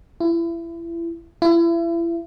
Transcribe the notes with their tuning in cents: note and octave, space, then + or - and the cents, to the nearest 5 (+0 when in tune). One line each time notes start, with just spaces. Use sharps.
E4 +30
E4 +35